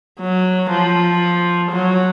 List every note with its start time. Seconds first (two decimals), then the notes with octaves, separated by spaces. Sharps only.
0.20 F#3
0.70 F3
1.71 F#3